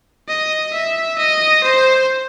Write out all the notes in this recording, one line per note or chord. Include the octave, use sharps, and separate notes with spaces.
D#5
E5
D#5
C5